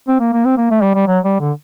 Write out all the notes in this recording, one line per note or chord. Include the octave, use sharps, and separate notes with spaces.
C4
A#3
A#3
C4
A#3
A3
G3
G3
F#3
G3
D3